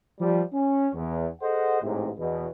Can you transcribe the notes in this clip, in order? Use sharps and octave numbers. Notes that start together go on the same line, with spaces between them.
F3 G3
C#4
E2
G#4 A4 C5 D#5 F#5
A1 G#2 C3
E2 B2